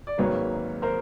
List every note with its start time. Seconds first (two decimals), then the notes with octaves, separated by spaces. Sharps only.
0.07 D5
0.18 G#1 G#2 D#3 F#3 A#3 B4 C#5
0.82 A#4 C5